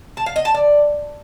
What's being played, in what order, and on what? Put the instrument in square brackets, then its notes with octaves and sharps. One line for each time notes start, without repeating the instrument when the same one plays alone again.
[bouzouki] A5
F5
D#5
A5
D5